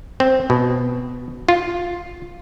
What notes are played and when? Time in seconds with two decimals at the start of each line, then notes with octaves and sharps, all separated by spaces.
0.20 C4
0.50 B2
1.49 F4